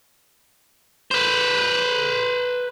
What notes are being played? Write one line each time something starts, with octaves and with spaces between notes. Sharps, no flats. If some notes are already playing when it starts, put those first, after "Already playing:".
B4 C5